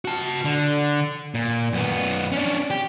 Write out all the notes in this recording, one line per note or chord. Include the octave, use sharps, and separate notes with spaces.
F#4 A5
D3
A#2
F#2 B3
C#4 D4
G4